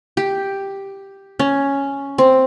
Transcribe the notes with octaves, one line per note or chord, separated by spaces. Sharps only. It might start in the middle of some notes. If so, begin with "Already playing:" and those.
G4
C#4
C4